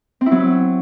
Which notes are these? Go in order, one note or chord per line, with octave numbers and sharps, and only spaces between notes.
C4
E4
F#3